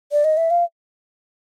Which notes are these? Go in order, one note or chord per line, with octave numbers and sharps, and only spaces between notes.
D5
D#5
E5
F5